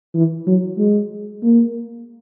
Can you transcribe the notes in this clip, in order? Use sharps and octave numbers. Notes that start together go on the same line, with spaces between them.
E3
F#3
G#3
A#3